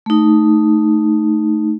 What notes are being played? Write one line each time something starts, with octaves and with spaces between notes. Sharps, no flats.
A3 D#4